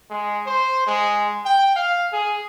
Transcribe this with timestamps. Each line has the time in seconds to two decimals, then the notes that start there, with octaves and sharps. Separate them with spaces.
0.10 G#3
0.46 C5
0.87 G#3
1.45 G5
1.76 F5
2.12 G#4